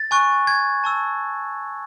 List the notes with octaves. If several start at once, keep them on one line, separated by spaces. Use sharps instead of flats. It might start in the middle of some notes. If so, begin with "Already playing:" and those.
Already playing: A6
G#5 C#6 F#6
G#6
A5 C#6 E6